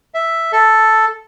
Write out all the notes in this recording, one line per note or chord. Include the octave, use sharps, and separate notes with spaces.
E5
A4